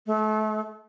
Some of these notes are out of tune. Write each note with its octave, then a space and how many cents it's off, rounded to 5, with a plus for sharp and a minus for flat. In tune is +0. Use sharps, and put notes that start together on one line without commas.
A3 -35